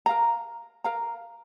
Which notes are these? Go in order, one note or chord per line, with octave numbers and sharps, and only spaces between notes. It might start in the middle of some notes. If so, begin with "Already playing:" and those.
A#4 F5 A#5
A#4 F5 A#5